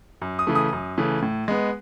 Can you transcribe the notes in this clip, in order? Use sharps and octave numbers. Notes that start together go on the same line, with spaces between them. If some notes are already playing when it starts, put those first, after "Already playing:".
F#2
D#6
C#3 E3 A3
D#6
F#2
C#3 E3 A3
A2
G#3 B3